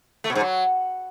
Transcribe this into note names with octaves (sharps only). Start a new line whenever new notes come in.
A3
B2
G#2
F#3